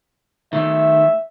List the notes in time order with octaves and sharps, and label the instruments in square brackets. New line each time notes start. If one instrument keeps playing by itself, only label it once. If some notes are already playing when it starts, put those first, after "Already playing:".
[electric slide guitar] D#3 A3 [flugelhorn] E5